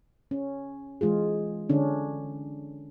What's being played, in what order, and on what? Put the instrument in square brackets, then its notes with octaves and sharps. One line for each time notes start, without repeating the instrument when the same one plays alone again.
[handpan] C#4
E3 G#3 F4 G#4
D3 C#4 D4